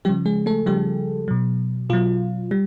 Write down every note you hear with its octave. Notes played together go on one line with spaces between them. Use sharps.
C#3 F3 G3 G4
G#3 G#4
A3 A4
C#3 F3 G3 G4
B2 F#3
B2 F#3 F4
G3